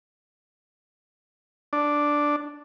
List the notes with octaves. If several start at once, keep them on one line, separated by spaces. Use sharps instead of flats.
D4